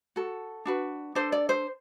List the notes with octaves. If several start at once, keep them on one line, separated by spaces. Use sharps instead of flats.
F#4 A4
D4 F#4 B4
D4 A4 C5
D5
C5